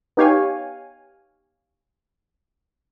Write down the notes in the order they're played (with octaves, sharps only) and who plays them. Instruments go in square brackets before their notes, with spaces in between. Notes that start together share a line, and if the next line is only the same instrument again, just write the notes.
[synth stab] B3 D#4 G4 C#5 F5 G#5